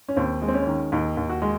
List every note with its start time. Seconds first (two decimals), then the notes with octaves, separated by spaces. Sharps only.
0.08 C#4
0.16 D#2 C4
0.42 G#3
0.48 C4
0.54 C#4
0.67 D#3
0.92 D#2 D#4
1.17 D#2
1.30 F#4
1.42 G#3